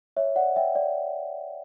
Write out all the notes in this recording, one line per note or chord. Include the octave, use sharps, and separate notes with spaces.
C#5 E5
D5 F#5
E5 G5
D5